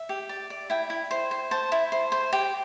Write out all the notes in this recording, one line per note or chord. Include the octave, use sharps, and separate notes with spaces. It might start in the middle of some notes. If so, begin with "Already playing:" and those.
Already playing: E5
G4
D5
D5
E4 G5
E4
C5
C5
C5 A5
E4
C5
C5
G4 G5